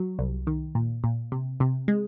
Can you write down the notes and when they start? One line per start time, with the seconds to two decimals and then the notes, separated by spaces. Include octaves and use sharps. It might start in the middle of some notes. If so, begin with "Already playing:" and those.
Already playing: F#3
0.19 C2
0.47 D#3
0.75 A#2
1.04 A#2
1.32 C3
1.60 C3
1.88 G#3